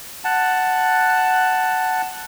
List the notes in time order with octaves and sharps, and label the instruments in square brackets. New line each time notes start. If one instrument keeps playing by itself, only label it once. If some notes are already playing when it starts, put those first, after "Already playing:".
[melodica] F#5 A5